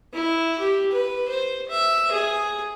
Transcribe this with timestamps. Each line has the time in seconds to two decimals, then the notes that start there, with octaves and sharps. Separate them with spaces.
0.14 E4
0.59 G4
0.92 B4
1.29 C5
1.69 E5
2.12 G#4